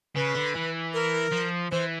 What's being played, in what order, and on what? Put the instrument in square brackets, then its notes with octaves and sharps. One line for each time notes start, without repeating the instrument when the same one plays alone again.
[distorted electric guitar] C#3 [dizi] B4
[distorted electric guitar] D3
E3
[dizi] A#4
[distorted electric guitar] F3
[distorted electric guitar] E3 [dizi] C5